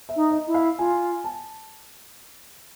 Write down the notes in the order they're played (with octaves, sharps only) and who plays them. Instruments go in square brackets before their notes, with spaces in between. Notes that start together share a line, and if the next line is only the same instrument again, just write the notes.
[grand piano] E5
[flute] D#4
[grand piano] D#5
[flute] E4
[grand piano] F5
[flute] F4 [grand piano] G#5
[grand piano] A5